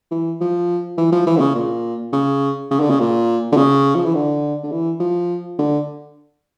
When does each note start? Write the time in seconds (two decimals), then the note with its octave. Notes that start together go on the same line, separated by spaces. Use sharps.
0.11 E3
0.41 F3
0.98 E3
1.12 F3
1.27 E3
1.37 D3
1.40 C#3
1.55 A#2
2.13 C#3
2.71 C#3
2.80 D3
2.90 C#3
3.00 A#2
3.52 D3
3.57 C#3
3.95 F3
4.05 E3
4.15 D3
4.64 D3
4.72 E3
5.00 F3
5.59 D3